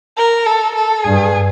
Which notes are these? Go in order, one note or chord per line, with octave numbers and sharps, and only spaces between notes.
A#4
A4
A4
G2 G#4